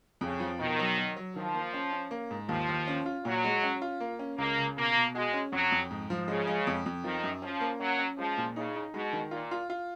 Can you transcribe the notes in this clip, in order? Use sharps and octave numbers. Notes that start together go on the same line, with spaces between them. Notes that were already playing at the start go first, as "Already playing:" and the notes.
F2 C#3
F3
B2 D#3
F#3
F#3
F#3
D#3 F3
A#3
C#4
C#4
A#3
G#2
D#2 F3
D#2
C#4
F4
A#2 F#3
G#3
C#4
F4
A#3
C#4
C#2 A#3
C#3
B2 A#3
B2
G#3 F#4
C#4
F2 F#3
F2
G#2
F3
C#3 G#3
G#3
F2
F2
D#3 F3
F#2
F3 C#4
A#3
F#3 C#4
C#4
F3 G#3
A#2
C#3 D#4
D#4
B2 G#3
D#3
A#2 F4
F4
F4